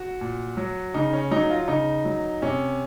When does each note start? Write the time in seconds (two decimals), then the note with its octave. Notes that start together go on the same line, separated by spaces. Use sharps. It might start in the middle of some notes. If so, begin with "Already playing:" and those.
Already playing: F#4
0.21 A#2
0.57 F#3
0.94 C#3 D#4
1.13 C#4
1.31 F#3 D#4
1.50 F4
1.68 C#3 D#4
2.05 F#3
2.42 C3 C#4